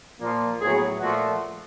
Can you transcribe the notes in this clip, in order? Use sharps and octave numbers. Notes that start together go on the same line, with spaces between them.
A#2 F3 A#3
A2 F#3 B3 G#4
A#2 F3 A3 F#4